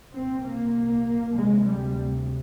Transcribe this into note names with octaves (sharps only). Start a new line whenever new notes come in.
C2 A#2 C4
A#3
D2 C3 G#3
G3